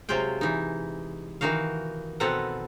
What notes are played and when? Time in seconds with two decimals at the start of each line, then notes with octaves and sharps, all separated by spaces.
0.09 C3 F#3 G#3 F4 G5
0.41 E3 D#4
1.41 D#3 E3 D#4 F#4 F5
2.20 B2 C4 A4 B4 F#5 A#5